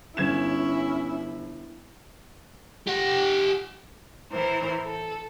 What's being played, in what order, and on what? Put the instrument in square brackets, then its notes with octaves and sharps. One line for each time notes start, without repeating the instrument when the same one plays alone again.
[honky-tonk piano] G1 G#6 E7 [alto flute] C#4 [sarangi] E4
[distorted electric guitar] G4 F#5
[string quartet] A2 E3 E4 A#4 C5
A4